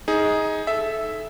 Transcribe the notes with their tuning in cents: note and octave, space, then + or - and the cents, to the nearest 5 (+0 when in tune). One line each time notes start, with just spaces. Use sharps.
D#4 +20 G#4 +0
A4 -20 E5 +0